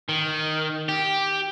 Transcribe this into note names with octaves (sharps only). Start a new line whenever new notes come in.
D#3
G4